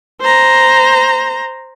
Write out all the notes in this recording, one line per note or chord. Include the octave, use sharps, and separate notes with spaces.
C5 A#5